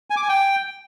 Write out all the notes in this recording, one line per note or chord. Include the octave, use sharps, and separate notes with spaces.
G#5
D6
G#5
G5